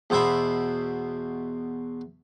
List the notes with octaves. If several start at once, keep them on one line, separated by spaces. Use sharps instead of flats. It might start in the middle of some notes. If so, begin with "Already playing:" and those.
E2 B2 C5 E5 B5